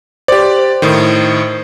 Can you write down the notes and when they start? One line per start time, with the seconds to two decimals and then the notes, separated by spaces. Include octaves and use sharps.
0.28 G4 C5 D5
0.82 A2 D#3